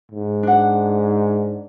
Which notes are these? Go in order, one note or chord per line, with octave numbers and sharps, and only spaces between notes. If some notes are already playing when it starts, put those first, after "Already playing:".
G#2
D4 F#5